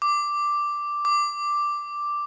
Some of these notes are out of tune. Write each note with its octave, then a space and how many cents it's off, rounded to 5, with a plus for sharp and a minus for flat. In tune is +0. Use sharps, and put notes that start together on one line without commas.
D6 +0
D6 +0